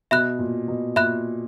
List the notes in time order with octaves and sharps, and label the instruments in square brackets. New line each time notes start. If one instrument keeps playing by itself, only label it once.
[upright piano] B2 [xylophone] E5 B5 F#6
[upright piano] A#2
B2
[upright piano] A#2 [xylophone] E5 B5 F#6